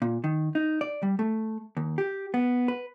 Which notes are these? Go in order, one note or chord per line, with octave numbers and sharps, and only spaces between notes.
A#2
D#3
D#4
D5
G3
A3
D#2
G4
B3
B4